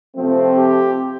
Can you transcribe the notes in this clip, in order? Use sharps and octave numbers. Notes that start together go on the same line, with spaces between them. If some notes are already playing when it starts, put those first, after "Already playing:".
C3 F3 A3 C4
G4